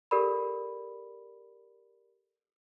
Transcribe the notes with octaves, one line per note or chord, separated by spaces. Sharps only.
G4 A4 A#4 D5 B5